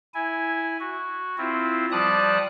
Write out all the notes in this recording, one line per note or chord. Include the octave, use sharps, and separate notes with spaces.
E4 G#5
F#4
C4 E4 F4
F3 G3 D5 A5 D#6 F#6